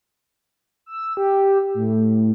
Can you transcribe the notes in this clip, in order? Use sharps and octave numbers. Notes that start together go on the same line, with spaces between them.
E6
G4
A2